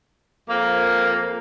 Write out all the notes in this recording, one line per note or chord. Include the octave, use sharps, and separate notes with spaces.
F2 A#3